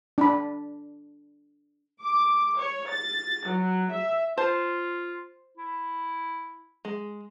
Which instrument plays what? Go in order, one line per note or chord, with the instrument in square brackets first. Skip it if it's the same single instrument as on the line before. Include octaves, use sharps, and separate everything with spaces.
[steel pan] D4 B5
[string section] D6
C#5
A6
F#3
E5
[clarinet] F4 [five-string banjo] C5 A5
[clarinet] E4
[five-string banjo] G#3